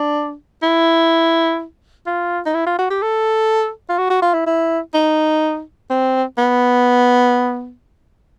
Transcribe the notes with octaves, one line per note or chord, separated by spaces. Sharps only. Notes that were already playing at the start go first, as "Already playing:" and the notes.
Already playing: D4
E4
F4
D#4
E4
F4
F#4
G4
A4
F4
F#4
F#4
F4
E4
E4
D#4
C4
B3